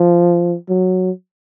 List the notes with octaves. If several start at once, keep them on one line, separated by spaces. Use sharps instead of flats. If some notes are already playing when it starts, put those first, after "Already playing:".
Already playing: F3
F#3